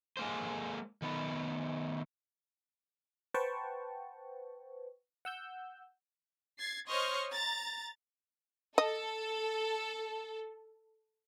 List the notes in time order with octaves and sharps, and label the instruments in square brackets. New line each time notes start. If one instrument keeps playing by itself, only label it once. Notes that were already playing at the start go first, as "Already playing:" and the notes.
[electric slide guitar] G#3 A#3 C5
D#3 B3
[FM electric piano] B4 C5 F#5 G5 A5 C#6
F#5 E6 G6
[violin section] G#6 A6 C7
C5 C#5 D#5 C6 C#6 F6
A#5 A6
[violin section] A4 [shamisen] D#5